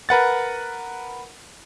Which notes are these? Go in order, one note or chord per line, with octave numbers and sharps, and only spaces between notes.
A#4 B4 F#5 A6